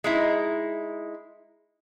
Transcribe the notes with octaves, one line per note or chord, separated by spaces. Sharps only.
G#3 D#4 E4